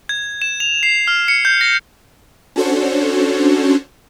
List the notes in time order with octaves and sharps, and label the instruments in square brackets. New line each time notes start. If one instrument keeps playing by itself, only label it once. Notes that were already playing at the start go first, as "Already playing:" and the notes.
[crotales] G#6
E7
F7
C7
F6
C#7
G6
A#6
[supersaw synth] C#4 D4 F#4 A4 C5 C#5